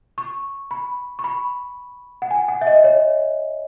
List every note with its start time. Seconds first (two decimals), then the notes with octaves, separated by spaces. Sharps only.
0.18 C#6
0.71 B5
1.19 C#6
1.24 B5
2.22 F#5
2.31 G#5
2.48 F#5
2.61 E5
2.67 D#5
2.84 C#5